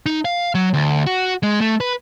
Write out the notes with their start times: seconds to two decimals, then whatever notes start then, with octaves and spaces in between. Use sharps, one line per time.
0.06 D#4
0.25 F5
0.55 F#3
0.74 D2
1.06 F#4
1.43 G#3
1.61 A3
1.80 B4